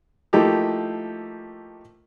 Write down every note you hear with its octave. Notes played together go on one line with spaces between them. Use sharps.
F3 A3 A#3 D#4 E4 G4